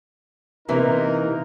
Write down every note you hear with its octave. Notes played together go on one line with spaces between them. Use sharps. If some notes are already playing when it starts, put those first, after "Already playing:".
C3 E3 A#3 D#4 A#4